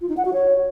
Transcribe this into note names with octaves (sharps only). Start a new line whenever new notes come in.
F4
D#4
F#5
F#4
C#5